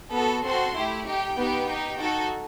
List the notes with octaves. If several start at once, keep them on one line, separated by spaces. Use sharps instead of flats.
B3 F#4 A4
C4 F#4 A4 C6
A3 E4 G4
D#4 G4 G5
B3 D#4 G4
D#4 G4
D#4 F#4 A4